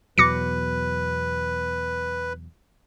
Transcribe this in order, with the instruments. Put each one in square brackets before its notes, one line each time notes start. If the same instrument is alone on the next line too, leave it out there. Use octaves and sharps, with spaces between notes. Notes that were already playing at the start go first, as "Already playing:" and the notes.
[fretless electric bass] E2 B2 F#3 [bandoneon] B4 [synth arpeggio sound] D6 A#6 C#7